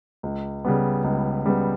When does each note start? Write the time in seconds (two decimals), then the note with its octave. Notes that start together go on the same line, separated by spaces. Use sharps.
0.23 C#2
0.65 C#3 G3 B3
1.04 C#2
1.45 C#3 G3 B3